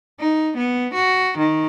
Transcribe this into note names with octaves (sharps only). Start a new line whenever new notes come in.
D#4
B3
F#4
D#3